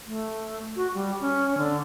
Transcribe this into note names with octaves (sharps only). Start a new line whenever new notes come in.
A3
F#4
G3
C#4
D3